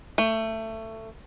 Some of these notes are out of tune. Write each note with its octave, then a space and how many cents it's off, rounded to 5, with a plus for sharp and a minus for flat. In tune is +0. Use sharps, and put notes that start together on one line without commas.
A3 +20